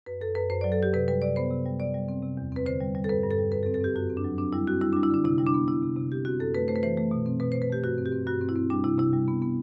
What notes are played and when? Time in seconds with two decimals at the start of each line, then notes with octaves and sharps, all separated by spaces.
0.06 F#2 B4
0.21 F#2 A4
0.35 F#2 B4
0.50 F#2 C5
0.61 D5
0.64 F#3
0.72 A4
0.79 F#3 G4
0.93 C3 B4
1.08 G3 B4
1.22 C3 D5
1.36 B3 C5
1.50 C3
1.66 G3
1.80 C3 D5
1.94 G3
2.09 C4
2.22 C3
2.37 E2
2.52 C4 B4
2.66 D3 C5
2.80 G3
2.95 G3
3.04 A4
3.09 G2 B4
3.23 G2
3.31 A4
3.38 G3
3.52 F#2 B4
3.63 A4
3.66 C4
3.74 A4
3.81 C4 G4
3.95 F#2 F#4
4.10 C4
4.17 D4
4.24 F#3
4.38 C4 D4
4.53 G3 E4
4.67 C4 F#4
4.81 G3 E4
4.93 D4
4.96 G3
5.03 E4
5.10 D3 D4
5.24 C3 E4
5.38 G3 E4
5.46 D4
5.54 B3
5.68 C3 E4
5.83 C3
5.96 C3
6.11 C4 G4
6.25 C4 F#4
6.40 F#2 A4
6.55 A3 B4
6.68 A3 C5
6.76 B4
6.83 E3 C5
6.98 A3
7.11 B2
7.26 C4
7.40 B2 B4
7.52 C5
7.56 B2
7.62 B4
7.70 A3 G4
7.84 G2 F#4
7.98 C4
8.06 G4
8.12 C4
8.26 G2 F#4
8.41 C4
8.49 E4
8.56 C4
8.70 G3 D4
8.84 C3 E4
8.98 C3 E4
9.13 G3
9.28 B3
9.42 B3